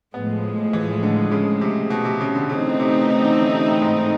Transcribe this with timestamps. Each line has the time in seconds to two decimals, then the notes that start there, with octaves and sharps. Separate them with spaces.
0.14 A2 F3 G#3 B3
0.73 E3
1.03 D3
1.32 C#3
1.61 C3
1.90 B2
2.05 C3
2.21 C#3
2.35 D3
2.50 C#3 E3 A3 C4 D#4
2.80 C3
3.09 C#3
3.23 D3
3.37 C#3
3.53 C3
3.68 A2
3.82 G#2